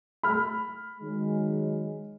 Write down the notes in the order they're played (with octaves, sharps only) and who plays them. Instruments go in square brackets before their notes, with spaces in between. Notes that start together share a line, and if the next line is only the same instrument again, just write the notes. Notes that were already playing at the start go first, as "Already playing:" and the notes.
[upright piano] B5 F6
[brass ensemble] D#3 F#3 G#3